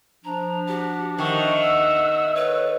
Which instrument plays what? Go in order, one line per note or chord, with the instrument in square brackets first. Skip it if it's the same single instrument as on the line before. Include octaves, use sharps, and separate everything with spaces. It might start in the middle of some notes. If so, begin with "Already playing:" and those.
[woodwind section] F3 D4 [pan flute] A#5
[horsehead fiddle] F#4 [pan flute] G4
[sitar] D#3 [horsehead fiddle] E5 F#5 [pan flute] C#6
[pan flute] E6
[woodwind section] A4 C#5 [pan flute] B4